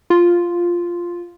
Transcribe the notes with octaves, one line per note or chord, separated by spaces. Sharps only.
F4